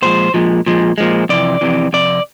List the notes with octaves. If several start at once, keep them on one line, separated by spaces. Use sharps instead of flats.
A#2 F3 G#3 C5
A#2 F3 G#3
A#2 F3 G#3
A#2 F3 G#3
F2 C3 E3 D5
F2 C3 E3
F2 C3 D5